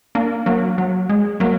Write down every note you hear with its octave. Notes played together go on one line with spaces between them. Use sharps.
A#3 D4
F#3 A#3
F#3
G#3
F#3 A#3